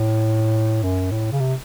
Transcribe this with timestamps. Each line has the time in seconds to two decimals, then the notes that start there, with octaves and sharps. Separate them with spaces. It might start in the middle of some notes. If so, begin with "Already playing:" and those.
Already playing: A2
0.83 F#2
1.11 A2
1.32 C#3
1.40 C3